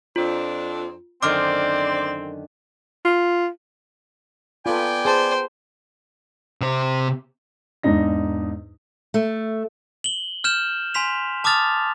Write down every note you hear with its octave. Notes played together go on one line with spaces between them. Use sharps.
F2 C4 D4 F4
F#2 D3 D#3 C4 C5 D5 D6 F6
F4
B3 F4 A4 D5 G5 G#5
G#4 C5 A5
C3 C5
E2 G#2 D4 D#4 A#6
A3
F#7 G7
F6 G6 E7
G#5 C6 B6 F7
A5 D6 D#6 F6 A6 F7